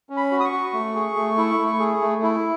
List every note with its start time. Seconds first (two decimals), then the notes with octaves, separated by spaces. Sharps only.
0.10 C#4
0.17 B5
0.31 F#4
0.40 D#6
0.45 C#6
0.52 F#4
0.73 A3
0.95 G#4
1.16 A3
1.37 E4
1.59 A3
1.79 G#4
2.01 A3
2.23 E4